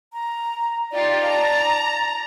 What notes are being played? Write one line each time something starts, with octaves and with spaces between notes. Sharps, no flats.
A#5
D#4 F4 G4 D5
A5 A#5